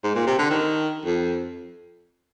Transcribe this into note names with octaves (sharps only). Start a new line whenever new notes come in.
G#2
A#2
C3
D3
D#3
F2